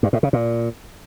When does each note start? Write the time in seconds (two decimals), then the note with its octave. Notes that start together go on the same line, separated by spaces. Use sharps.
0.03 G2
0.13 A2
0.23 C#3
0.33 A#2